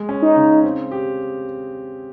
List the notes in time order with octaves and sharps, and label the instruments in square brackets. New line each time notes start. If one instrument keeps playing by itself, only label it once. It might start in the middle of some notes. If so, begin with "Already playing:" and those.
Already playing: [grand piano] G#3
C#4
[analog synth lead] D#4
[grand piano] C#3
C4
G4